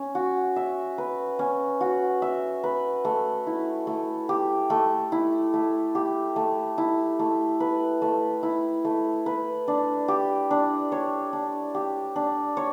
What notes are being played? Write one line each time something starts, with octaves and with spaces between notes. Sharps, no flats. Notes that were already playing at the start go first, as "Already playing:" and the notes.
Already playing: C#4
F#4
E5
B4
C#4
F#4
E5
B4
A3
E4
A3
G4
A3
E4
A3
G4
A3
E4
A3
B4
A3
E4
A3
B4
D4
G4
D4
C#5
D4
G4
D4
C#5